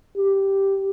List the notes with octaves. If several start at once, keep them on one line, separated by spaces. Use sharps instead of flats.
G4